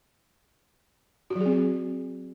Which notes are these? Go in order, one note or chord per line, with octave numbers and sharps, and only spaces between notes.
F#4
F#3
G#4
C4